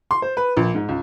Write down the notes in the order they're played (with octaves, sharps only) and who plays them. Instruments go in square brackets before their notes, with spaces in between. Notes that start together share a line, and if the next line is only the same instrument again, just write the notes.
[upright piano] C6
C5
B4
A#1
G#2
C#2